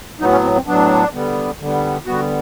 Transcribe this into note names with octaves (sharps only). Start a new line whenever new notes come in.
A2 F#3 B3 D#4
C#4
C4
C4
A2 F#3 B3 D4
D3 G3 B3
D3 G3 B3
D3 G3 B3 F#4